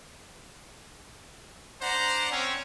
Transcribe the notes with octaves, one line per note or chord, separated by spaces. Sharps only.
D4 C5 D5 F#5 A#5
C4 C#4